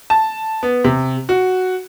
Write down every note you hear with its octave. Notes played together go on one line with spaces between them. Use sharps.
A5
B3
C3
F#4